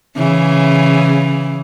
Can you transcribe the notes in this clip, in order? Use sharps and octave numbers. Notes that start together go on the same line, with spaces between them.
C#3 E3